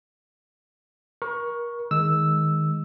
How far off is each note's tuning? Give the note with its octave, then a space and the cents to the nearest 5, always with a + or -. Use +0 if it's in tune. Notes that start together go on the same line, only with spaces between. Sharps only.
A#4 +30 C#6 +0
D#3 +0 G#3 +0 E6 -5